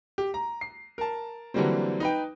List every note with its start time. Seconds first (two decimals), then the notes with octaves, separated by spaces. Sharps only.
0.18 G4
0.34 A#5
0.61 C7
0.98 A#4 A5
1.54 D3 E3 F#3 G3 A#3 C4
2.00 D#4 B4 G5